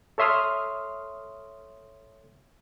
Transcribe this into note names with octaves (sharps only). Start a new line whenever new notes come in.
A4 C#5 E5 C6 D#6 F6